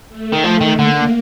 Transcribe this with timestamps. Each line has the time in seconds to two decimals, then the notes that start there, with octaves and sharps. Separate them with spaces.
0.09 A3
0.33 D#3
0.44 F3
0.61 D#3
0.78 D3 A#3